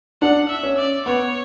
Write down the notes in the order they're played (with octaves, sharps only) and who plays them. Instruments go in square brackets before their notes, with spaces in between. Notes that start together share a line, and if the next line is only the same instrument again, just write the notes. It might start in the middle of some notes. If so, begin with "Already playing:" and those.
[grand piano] D4 [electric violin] F#5
[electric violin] E5
[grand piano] C#4
[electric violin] D5
[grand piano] B3 [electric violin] C#5